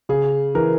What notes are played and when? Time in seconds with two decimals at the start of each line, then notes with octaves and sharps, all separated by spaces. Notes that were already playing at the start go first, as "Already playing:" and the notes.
0.09 C#3 G#4
0.55 E3 A#4